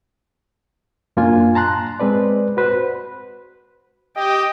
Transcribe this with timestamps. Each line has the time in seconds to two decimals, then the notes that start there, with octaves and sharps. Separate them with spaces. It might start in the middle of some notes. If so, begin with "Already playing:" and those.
1.17 F#2 A#3 D4 F4 G#5
1.55 A5 A#5 C6 F#6
2.00 G#3 C4 B4 D5
2.57 F#4 B4 C5
4.17 G4 D#5 G5